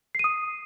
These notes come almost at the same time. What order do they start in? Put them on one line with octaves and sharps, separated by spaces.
C7 D#7 D#6